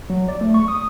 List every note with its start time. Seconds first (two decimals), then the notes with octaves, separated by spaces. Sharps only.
0.10 F#3
0.28 D5
0.41 A3
0.54 C#6
0.68 D#6